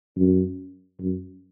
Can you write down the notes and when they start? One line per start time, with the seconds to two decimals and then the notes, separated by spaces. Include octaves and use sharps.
0.17 F#2
1.01 F#2